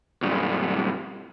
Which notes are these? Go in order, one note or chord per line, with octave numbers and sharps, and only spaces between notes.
B1 G2